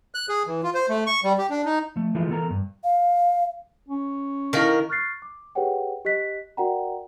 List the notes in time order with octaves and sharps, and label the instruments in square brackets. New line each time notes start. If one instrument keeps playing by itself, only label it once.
[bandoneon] F#6
G#4
E3
F4
C5
A3
C#6
G3
G4
D4
D#4
[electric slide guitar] F3 A3
E3 F3 G#3 A3 E4 F4
E3 B3 A4 A#4 A#5
G2
[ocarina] F5
[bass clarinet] C#4
[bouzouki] D#3 A#4 [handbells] E4 F5 C#6
[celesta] C#6 F6 F#6 A6 C7
D6
G4 G#4 B4 C#5 F#5 G5
G4 D#5 F#6 B6
F#4 A#4 D5 F#5 G5 A#5